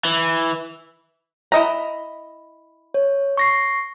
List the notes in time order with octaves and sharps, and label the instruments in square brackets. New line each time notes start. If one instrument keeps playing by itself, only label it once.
[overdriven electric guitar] E3
[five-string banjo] E4 D#5 A#5
[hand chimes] C#5
C#6 A#6 C7